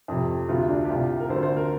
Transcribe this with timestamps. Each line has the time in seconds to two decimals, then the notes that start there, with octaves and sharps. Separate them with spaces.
0.08 F2 C3
0.49 D2 C3 F4
0.69 D4
0.85 G4
0.89 C2 C3 F4
1.20 A#4
1.29 D2 D3 C5
1.43 C5
1.56 A#4